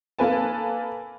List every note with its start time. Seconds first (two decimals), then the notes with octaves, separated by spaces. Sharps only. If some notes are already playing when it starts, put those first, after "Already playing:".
0.19 A#3 A4 B4 G#5 A5